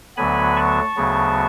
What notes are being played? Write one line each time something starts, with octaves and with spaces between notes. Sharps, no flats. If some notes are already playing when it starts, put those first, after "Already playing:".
D2 D3 F#3 B3 G#5 B5
A5 C#6
D2 C#3 F#3 B3